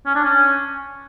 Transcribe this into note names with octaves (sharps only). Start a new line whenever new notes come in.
C#4
D4
C#4